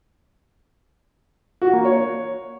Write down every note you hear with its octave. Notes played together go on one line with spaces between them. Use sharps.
F#4
A#3
C#5